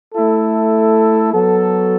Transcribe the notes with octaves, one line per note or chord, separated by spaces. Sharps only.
A3 E4 A4
F#3 B3 F#4 A4